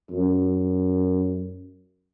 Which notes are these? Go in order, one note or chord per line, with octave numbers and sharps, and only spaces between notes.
F#2